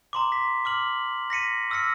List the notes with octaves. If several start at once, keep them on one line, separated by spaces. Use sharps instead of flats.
A#5 C6 D6
B6
D6 F6 F#7
A#6 B6 C#7 D#7
D6 E6 F6 A#6 C#7